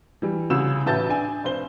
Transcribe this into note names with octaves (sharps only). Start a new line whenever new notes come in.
E3 G3
C2 C#3 E6 E7
A1 B4 E5 A5 G6 A6
D4 G#5
F1 C5 G7